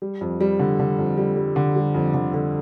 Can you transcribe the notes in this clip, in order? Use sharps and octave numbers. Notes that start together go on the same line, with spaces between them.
G3
F2
G3
D3
D3
F2
G3
G3
D3
G3
F2
D3
D3